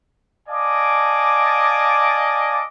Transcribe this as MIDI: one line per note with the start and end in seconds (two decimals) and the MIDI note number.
0.48 2.63 74
0.48 2.63 75
0.48 2.63 77
0.48 2.63 80
0.48 2.63 81
0.48 2.63 86